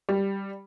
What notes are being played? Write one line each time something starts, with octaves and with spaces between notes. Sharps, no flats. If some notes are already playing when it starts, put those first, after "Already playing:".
G3